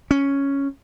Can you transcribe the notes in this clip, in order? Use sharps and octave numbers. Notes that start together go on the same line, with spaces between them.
C#4